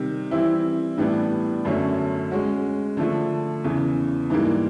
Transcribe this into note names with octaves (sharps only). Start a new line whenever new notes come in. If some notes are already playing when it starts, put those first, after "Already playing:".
Already playing: C3 D#3 G3
E3 G3 C4 E4
A2 E3 G3 B3 D4
F#2 D3 F#3 A3 C#4
G#3 C#4 F#4
D3 F3 A3
E2 C#3 E3
G#2 E3 G3 A#3